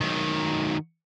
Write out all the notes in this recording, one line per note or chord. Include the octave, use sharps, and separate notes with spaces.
D#3 F#3